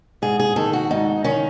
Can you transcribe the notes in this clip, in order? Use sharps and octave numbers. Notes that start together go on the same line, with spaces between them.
G#2 G#4
G#4
D#3 A4
F#4
G#2 D#4
D#3 C#4